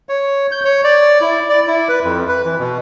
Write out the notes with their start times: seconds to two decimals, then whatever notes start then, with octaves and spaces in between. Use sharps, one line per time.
0.09 C#5
0.52 G6
0.65 C#5
0.84 D5
1.21 E4
1.49 D5
1.67 E4
1.89 B4
2.04 F2
2.29 B4
2.44 E3
2.59 B2